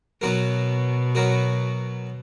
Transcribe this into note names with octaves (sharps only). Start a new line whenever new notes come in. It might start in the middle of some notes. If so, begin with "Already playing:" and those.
B2 F#3 B3 F#4 A#4
F#3 B3 F#4 A#4